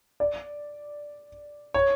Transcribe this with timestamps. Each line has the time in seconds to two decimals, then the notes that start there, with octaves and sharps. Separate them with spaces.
0.20 D5
1.74 C#5